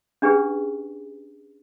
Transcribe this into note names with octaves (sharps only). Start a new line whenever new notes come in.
C#4 D4 G4 G#4 B4